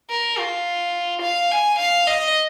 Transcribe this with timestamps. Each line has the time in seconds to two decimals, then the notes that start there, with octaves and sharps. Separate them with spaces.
0.10 A#4
0.38 F4
1.22 F5
1.51 G#5
1.79 F5
2.07 D#5